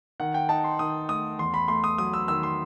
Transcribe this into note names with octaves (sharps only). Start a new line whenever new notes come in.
D#3 F#5
G5
D#4 A5
C6
D#3 D#6
A3 D#6
E2 C6
B5
A3 C6
D#6
F#3 D#6
E6
D#3 E6
C6